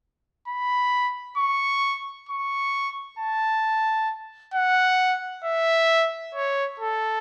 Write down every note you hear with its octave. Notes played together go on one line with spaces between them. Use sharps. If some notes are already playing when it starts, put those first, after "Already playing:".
B5
C#6
C#6
A5
F#5
E5
C#5
A4